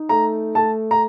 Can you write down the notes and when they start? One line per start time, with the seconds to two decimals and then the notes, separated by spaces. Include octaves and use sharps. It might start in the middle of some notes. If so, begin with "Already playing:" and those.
Already playing: D#4
0.09 A3 A#5
0.55 A3 A5
0.91 A#5